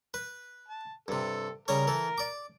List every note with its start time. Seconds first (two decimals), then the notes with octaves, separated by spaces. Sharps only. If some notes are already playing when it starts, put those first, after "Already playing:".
0.14 B4
0.68 A5
1.08 G2 C3 A4
1.68 C#3 G3 A#4 C#5
1.87 E3 A4
2.18 D5 D6